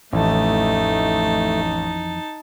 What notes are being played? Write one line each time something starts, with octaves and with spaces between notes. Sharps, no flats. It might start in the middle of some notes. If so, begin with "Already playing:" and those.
A1 F2 E3 A3 D#4 A5